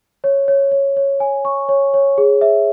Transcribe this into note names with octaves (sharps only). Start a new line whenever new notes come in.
C#5
C#5
C#5
C#5
G#5
C#6
C#5
C#5
G#4
E5